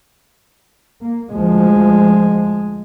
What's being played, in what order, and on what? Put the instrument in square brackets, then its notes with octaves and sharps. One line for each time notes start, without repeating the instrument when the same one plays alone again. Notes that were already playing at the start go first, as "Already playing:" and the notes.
[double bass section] A#3
[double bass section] D2 F3 [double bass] G#3